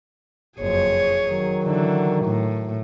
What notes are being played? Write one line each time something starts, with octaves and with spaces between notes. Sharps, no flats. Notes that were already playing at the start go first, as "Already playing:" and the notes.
F#1 F2 G#4 C#5
D#3 F#3
D3 E3
A2